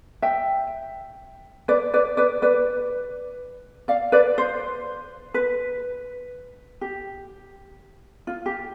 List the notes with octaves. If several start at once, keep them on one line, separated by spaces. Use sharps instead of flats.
E5 G5
B4 D5
B4 D5
B4 D5
B4 D5
D5 F5
B4 D5
C5
B4
G4
F4
G4